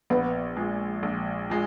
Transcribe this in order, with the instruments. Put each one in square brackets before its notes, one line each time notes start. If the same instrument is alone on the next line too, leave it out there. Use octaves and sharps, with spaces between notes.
[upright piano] A#1 [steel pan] B3
[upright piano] A#2 G#3
A#1
A#2 G#3